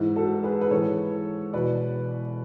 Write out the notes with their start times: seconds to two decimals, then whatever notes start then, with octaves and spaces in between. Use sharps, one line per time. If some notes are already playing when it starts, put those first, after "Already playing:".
Already playing: G#2 E3 E4
0.16 F#4 A4
0.44 G#4 B4
0.61 B4
0.71 G#2 E3 A4 C#5
1.53 E2 B2 B4 D5